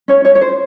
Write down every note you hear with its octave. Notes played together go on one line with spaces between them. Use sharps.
C#4 C#5
C#4 C#5
C#5
C5